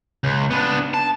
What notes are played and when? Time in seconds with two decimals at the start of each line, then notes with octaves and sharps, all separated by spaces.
0.24 C#2
0.51 B3 D4
0.94 A5